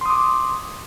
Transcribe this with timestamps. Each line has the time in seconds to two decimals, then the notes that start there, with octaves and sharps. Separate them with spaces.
0.01 C6
0.06 D#6
0.10 D6